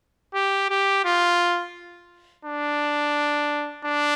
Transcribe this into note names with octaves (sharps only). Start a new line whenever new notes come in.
G4
G4
F4
D4
D4